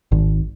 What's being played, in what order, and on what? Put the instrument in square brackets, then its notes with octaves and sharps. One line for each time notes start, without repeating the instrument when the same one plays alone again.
[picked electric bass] G#1